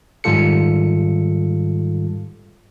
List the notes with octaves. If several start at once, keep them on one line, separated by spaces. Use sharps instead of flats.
G#2 D#3 G3 F4 A4 C#7